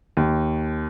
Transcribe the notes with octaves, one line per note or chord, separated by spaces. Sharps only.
D#2